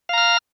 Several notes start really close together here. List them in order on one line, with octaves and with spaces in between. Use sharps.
F5 A#5 F6